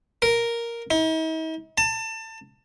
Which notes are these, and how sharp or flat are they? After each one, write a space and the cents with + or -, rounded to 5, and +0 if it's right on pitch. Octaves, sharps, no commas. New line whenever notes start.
A#4 +0
D#4 +45
A5 +25